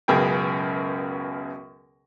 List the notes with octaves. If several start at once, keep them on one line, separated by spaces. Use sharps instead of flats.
C#2 F#2 B2 G#4 G5